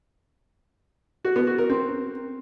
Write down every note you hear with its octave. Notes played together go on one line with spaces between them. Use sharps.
F#4
B3
F#4
A#4
C4